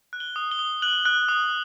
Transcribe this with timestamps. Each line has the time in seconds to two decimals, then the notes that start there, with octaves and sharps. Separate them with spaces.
0.13 F#6
0.20 G7
0.36 D#6
0.51 G7
0.59 D#6
0.82 F#6 F#7
1.05 F#6
1.28 D#6